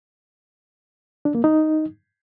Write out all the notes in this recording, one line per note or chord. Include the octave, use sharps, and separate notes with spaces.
D4
A#3
D#4